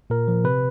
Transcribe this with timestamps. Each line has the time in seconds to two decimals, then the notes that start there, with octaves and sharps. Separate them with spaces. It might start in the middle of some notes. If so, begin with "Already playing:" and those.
0.10 A#2 A#4
0.28 F3
0.44 C3 B4